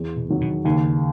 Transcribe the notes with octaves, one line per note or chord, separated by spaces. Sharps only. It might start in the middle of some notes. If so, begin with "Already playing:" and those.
Already playing: E2
B2
D#3 F#3
B2
D#2 C#3